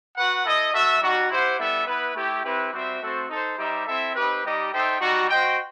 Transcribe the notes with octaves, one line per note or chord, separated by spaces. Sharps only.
F#4 B4 F#5
E4 A4 D#5
F#4 A4 E5
G3 D#4 F#4
E4 G4 C5 F#5
G3 B3 E4 A4 E5
B3 E4 B4
A3 E4 G4
C4 E4 G4 B4
G3 C4 F#4 C5 E5
A3 C4 F#4 A4 C5
D#4 A4 C5
G3 D#4 G4 C5 E5
C4 E4 A4 E5
C4 D#4 G4 B4
G3 D#4 G4 D#5
D#4 A4 C5 E5 G5
G3 D#4 F#4
F#4 C5 D#5 G5